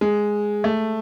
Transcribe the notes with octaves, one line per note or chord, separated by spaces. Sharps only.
G#3
A3